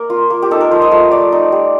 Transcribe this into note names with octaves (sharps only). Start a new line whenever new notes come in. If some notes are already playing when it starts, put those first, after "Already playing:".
Already playing: A#3 A#4
F4
A#3
G4
D#4 A4
A#4
F3 C5
D#5
A3 F5
A3 D5
D#4
G3